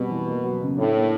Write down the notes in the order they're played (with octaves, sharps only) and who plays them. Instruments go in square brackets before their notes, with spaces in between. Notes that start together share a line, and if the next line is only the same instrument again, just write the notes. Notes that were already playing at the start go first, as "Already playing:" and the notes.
Already playing: [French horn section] B2 [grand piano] G3 C4
[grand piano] E3
A#3
F#3
C#3
[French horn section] A2 [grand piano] D4
[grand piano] A#3